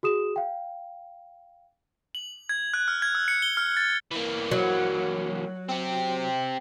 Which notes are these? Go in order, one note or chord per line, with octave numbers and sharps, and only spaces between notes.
F#4 G#4 D#6 E7
F5 G5
F#7
G#6
F#6
F6
G#6
E6
C#7
G7
F6
A6
E3 A#3
F#3
C4 G4